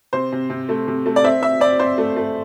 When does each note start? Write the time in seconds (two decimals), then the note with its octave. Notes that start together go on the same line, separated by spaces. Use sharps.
0.13 C3 C5
0.32 C3
0.50 C3
0.69 A3
0.88 C3
1.06 A3
1.16 D5
1.24 C4 E5
1.42 C4 E5
1.61 C4 D5
1.79 C4 C5
1.98 A3
2.16 A3